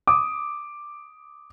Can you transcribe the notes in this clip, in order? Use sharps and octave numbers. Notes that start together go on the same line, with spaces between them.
D6 D#6